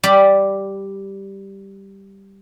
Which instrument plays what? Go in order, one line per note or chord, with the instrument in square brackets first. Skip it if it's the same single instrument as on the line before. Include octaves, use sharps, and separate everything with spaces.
[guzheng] G3 G4 B5